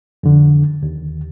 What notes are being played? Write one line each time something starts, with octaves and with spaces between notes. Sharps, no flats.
F2 D3
D#2